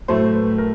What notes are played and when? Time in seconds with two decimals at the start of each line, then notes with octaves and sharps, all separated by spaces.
0.08 A2 F#3 A3 C5
0.34 B4
0.58 A#4